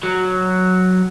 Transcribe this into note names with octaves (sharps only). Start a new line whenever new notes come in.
F#3